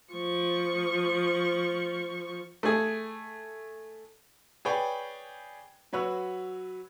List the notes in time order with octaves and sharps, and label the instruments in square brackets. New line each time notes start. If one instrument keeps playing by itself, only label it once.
[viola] F3 C#6
[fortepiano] A3 G#4
[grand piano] G#4 B4 C#5 D5 G5
F#3 F#4 B4 C#5 E6 F#6